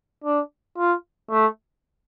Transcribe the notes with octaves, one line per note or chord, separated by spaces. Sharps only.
D4
F4
A3